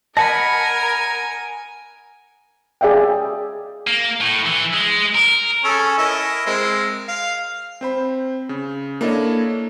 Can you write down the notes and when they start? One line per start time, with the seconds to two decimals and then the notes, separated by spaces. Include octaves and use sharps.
0.17 A#4 D#5 F#5 G#5 A5 B5
2.81 G#4 D5 E5 F5 G5
3.87 A#3
4.21 A2
4.46 E3
4.74 G#3
5.15 A#4
5.64 C#4 G#4 A4
5.98 E4 A#4 D#5
6.46 G#3 C4 A#4
7.08 F5
7.81 C4 C5 B5
8.49 C#3
9.01 A#3 D4 E4 A4 C#5 D#5